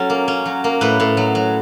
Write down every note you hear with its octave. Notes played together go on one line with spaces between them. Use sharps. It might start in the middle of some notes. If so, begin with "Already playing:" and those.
Already playing: F#3 C#4 A4
A#3
C#4
F#3
A#3
A2 B4
A2
F#3
F#3